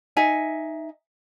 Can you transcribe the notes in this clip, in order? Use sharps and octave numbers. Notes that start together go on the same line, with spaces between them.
D#4 E5 G#5